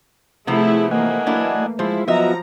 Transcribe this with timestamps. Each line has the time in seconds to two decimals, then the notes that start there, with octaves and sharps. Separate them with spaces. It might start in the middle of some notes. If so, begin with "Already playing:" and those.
0.47 C3 F3 A3 B3 E4 G#4
0.91 E3 A3 A#3 D#5 F#5 G#5
1.26 F#3 D4 E4
1.79 F3 G#3 E4 F4 C5
2.08 F3 F#3 B3 F4 F#4 D#5 E5 A#5